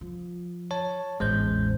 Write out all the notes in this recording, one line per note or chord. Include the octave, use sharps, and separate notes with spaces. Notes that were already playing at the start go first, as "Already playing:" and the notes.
F3
C#5 A5
A1 E2 G#3 C5 G6